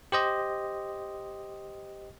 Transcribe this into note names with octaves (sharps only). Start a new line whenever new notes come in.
G4 C5 D#5